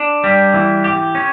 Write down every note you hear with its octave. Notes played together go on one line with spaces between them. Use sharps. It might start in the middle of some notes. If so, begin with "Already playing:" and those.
Already playing: D4
G3
E3
G4
C#4